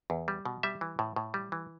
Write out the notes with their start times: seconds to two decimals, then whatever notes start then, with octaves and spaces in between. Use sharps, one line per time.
0.10 E2
0.28 G3
0.45 B2
0.63 G3 E5
0.81 E3
0.99 A2
1.16 A2
1.34 G3
1.52 E3